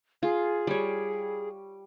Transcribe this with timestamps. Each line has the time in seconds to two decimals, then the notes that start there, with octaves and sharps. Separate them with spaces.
0.23 F4 G#4
0.67 G3 C#5